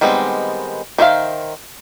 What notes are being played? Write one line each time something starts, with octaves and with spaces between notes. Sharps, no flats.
D#3 G3 G#3 B3 C4
D#3 C5 E5 F5